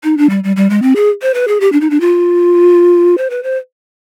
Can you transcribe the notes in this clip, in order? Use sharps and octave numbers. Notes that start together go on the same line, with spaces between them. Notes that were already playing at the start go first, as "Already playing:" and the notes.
D#4
D4
G3
G3
G3
G#3
C4
G#4
C5
B4
G#4
G4
D4
D#4
D4
F4
C5
B4
C5